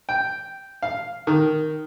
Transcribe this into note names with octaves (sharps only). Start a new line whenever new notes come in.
G5
F5
D#3